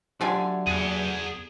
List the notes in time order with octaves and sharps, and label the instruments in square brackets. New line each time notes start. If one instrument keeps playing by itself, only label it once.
[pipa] D3 F4 G#5 [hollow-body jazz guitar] F#3 A3 G4
[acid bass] E2 [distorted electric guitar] G#4 F#5